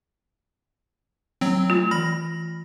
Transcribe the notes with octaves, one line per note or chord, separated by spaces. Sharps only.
F#3 C4
A3 F4
E3 B5 A#6